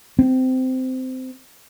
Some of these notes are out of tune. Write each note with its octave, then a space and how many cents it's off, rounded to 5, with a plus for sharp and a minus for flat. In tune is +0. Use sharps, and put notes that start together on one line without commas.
C4 -20